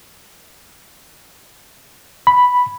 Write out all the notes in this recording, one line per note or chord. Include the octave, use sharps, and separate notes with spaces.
B5